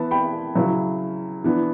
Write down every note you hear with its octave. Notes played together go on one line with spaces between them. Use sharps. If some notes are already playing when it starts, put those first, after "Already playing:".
Already playing: E3 B3 E4 A5
G5 B5
C#3 F#3 C#4 E4
E3 B3 D4